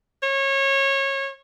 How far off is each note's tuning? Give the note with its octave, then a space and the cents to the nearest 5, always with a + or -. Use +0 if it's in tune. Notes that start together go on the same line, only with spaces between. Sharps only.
C#5 -25